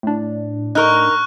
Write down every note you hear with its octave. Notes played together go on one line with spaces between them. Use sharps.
A2 D4
D#4 A#4 C#6 F6 F#6